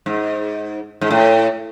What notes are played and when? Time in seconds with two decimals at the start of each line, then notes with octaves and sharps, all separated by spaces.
0.06 G#2
1.01 G#2
1.11 A2